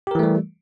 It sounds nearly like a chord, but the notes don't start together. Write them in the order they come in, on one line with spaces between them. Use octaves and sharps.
G4 A#4 E3 A3 G3